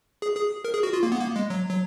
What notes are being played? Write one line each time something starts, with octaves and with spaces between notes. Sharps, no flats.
G#4
G#4
A#4
G#4
F#4
F4
A#3
B3
A#3
G#3
F#3
F#3